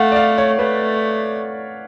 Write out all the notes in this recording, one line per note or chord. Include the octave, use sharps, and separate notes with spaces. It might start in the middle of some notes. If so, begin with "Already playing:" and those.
Already playing: A3 F5 F#5
D5
F5
C#5
A3 B4